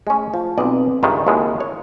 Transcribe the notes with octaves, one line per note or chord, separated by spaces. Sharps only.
G#3 A3 C#4
F3 F4 A5
B1 C4 B4 D5 D#5
C#2 G2 D#3 E5 F5 C#6
D#2 A2 G#3 F#4
C#5